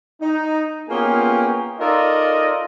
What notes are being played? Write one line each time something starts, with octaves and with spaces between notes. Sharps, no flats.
D#4
A#3 B3 C#4 F4 G4 G#4
D#4 F4 A4 A#4 D5 D#5